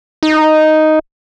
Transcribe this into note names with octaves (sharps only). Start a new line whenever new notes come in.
D#4